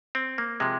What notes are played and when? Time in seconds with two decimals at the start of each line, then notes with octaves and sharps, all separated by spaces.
0.15 C4
0.38 A#3
0.60 C3 F3 G#3